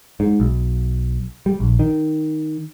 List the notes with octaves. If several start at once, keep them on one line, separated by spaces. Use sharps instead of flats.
G#2
B1
G3
A#1
D#3